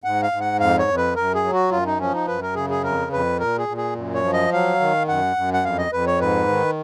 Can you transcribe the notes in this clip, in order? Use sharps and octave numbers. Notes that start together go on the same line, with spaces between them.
G#2 F#5
F5
G#2
F#5
F2 F5
C#5
F2
B4
F#2 A#4
G#4
F#3
F#4
F#2 F4
D#4
F3 C#4
D#4
F#2 B4
A#4
C#3 G#4
G#4
F2 A#4
F2 B4
A#2 A#4
G#4
A#2
G#4
F#2
C#5
F3
D#5
F#3 F5
D#3
F#2 F#5
F#2
F#5
F2 F5
D#5
F2 B4
C#5
G#2 B4
D#3